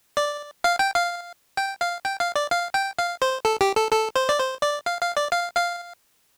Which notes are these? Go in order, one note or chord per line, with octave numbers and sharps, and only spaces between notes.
D5
F5
G5
F5
G5
F5
G5
F5
D5
F5
G5
F5
C5
A4
G4
A4
A4
C5
D5
C5
D5
F5
F5
D5
F5
F5